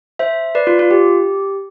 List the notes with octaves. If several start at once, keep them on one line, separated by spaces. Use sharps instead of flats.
C5 E5
B4 D5
F4
F4
G4